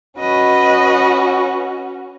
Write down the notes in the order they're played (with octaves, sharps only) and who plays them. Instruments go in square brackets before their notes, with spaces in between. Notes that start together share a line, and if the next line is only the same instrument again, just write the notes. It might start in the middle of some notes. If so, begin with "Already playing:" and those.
[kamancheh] C#4 F#4 [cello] B4 D#5